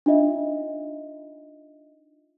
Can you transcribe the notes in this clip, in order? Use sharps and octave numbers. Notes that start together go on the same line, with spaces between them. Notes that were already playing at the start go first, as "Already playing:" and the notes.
D4 D#4 F4 D#5 E5